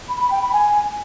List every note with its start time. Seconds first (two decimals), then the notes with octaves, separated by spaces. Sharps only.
0.08 B5
0.19 B5
0.30 G5
0.41 B5
0.52 G#5